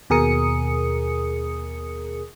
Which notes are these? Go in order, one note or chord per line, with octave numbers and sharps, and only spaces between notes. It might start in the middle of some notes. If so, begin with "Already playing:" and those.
D#2 B2 G#4 A#4 D#6 C#7